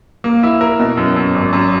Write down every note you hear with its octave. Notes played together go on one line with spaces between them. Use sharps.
A#3
E4
A#4
B2
F#2
F#2
G#1
F#2